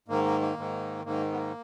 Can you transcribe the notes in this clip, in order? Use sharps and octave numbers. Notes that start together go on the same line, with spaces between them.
G#2 D#3 A#3
A#3
A#3
G#2 D#3
G#2 D#3 A#3
B3
A#3